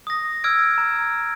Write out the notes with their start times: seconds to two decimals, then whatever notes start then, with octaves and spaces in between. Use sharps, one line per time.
0.07 D#6 A#6
0.44 E6 F6 G#6 D7
0.78 A#5